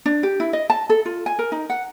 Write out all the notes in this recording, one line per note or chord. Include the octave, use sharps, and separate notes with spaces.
D4
G4
E4
D#5
A5
A4
F4
G#5
A#4
D#4
F#5